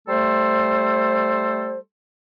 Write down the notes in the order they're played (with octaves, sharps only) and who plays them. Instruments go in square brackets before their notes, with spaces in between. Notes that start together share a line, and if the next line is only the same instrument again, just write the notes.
[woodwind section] G3 A3 A4 C5